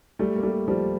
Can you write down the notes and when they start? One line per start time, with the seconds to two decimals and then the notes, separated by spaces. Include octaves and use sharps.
0.19 G3 A3
0.36 A#3
0.43 G3 A3
0.68 F3 G3